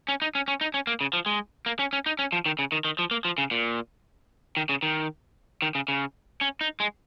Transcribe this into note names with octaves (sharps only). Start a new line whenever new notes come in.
C#4
D#4
C#4
C#4
D#4
C#4
A#3
C#3
F3
G#3
A#3
C#4
C#4
D#4
C#4
F3
D#3
C#3
D#3
D#3
F3
A#3
F3
C#3
A#2
D#3
C#3
D#3
D#3
C#3
C#3
C#4
D#4
G#3